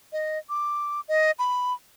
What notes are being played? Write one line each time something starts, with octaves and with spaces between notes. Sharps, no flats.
D#5
D6
D#5
B5